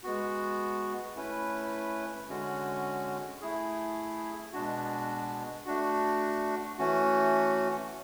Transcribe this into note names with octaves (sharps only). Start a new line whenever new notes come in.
G#3 B3 F#4
A3 C#4 E4 B4
D3 G#3 C#4 F#4
A3 E4 G#4
B2 G#3 D4 F#4
A3 D4 F#4
E3 A3 C#4 F#4